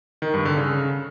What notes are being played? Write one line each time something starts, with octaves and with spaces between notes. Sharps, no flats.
D#3
G2
D3
C#3